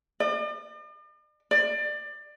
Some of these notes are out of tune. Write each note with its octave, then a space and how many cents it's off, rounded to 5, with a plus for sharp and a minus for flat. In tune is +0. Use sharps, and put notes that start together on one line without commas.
D5 +45
D5 +25